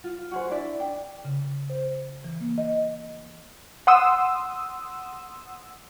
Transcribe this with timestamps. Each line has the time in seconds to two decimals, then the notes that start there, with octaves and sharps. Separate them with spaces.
0.04 F4
0.31 F#4 G#4 C5
0.49 D4 E4 D5 E5
0.79 D4 G5
1.25 C#3
1.70 C5
2.24 E3
2.41 A#3
2.58 D#5
3.87 F#5 C6 D#6 E6